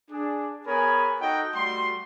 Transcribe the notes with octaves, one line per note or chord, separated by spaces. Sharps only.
D4 G#4
B3 G#4 A#4 C#5 G#5 B5
D#4 F#4 A4 D#5 G5
G3 A3 F#4 C6